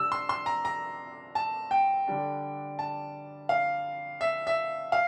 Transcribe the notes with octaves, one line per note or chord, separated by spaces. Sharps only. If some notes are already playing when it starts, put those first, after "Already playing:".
Already playing: C3 G3 D4 E6
C6
C6
A#5
A#5
A5
G5
D3 G3 D4
A5
F5
E5
E5
F5